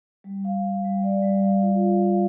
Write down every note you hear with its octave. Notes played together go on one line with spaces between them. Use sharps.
G3
F5
F5
G3
D5
G3
F5
F4
F5
F5